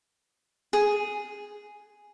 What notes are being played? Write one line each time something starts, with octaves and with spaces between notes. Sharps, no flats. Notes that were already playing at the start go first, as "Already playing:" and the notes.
G#4